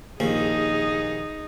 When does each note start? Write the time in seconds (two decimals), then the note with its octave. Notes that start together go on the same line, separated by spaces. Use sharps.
0.20 A#1 D#2 F3 D#4 G#4